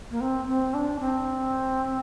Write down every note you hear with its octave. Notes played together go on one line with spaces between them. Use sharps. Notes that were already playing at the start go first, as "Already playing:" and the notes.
A#3
C4
C4
D4
C4